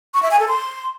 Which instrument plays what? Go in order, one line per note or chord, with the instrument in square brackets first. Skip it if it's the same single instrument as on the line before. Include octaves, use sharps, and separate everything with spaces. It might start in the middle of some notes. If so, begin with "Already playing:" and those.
[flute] C#6
E5
G#5
A4
C6